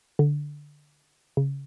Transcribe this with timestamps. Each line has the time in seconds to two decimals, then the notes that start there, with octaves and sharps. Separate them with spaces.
0.19 D3
1.37 C#3